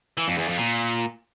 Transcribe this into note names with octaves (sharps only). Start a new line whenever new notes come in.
E3
F2
E2
F2
A#2